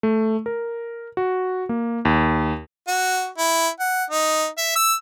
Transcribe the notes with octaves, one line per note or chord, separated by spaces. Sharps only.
A3
A#4
F#4
A#3
D#2
F#4
E4
F#5
D#4
E5
E6